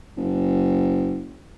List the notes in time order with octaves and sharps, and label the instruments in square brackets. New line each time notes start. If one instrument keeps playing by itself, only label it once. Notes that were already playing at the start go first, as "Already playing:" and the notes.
[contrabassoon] F#1